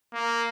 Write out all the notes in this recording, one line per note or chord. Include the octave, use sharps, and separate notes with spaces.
A#3